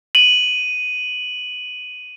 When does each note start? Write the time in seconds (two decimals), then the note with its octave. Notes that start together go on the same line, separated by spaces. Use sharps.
0.15 D#7 F#7